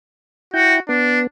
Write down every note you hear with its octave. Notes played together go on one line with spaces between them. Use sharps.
E4 F#4 G5
B3 D4